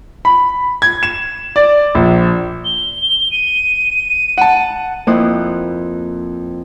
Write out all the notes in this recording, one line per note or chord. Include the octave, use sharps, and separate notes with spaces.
B5
G#6
E7
D5
A#1
G7
D#7
F#5 A5
F2 A#3 E4 C5 D#6 F#6